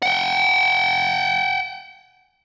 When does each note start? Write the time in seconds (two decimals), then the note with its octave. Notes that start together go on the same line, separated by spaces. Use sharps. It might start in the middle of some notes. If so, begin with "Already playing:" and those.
0.03 F#5 G5